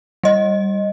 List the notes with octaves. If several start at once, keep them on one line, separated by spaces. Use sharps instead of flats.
G3 D#5